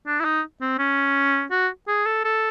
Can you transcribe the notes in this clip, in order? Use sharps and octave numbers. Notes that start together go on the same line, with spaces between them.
D4
E4
D#4
C4
C#4
F#4
G#4
A4
A4